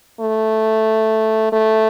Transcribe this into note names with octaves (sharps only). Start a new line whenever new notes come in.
A3
A3